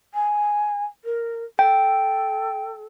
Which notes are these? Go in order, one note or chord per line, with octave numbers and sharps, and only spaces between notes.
G#5
A#4
A4 G5